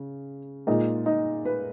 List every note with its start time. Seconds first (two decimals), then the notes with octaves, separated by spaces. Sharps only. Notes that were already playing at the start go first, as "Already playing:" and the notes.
Already playing: C#3
0.67 A#2 G#3 D#4 D#5
1.06 D#4 D#5
1.45 B4